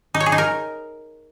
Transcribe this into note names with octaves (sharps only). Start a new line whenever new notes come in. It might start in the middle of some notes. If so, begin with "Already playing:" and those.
D#4
C#5
G#4
D#4
A#4